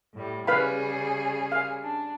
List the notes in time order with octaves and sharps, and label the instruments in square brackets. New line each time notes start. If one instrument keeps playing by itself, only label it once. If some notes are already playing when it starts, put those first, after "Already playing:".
[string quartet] A2 G3
[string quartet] C#3 G3 G#4 [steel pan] B4 F5 B5
[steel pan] F5
[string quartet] D4